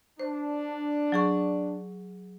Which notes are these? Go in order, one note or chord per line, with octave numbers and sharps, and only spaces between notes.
D4 C5
F#3 G#4 C#6